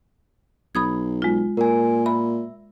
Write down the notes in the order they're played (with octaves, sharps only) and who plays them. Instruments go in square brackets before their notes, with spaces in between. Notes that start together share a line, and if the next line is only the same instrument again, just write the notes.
[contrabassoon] B1 [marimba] B5 D#6 G#6
[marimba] G#3 F4
[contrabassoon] A#2 [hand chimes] A#4 G#5
[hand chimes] E5 [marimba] B5